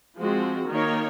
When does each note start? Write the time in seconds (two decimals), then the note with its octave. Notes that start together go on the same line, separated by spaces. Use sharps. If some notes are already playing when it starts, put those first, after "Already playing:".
0.18 F3 G#3 C4 F#4
0.69 D#3 A#3 D#4 A#4 C#5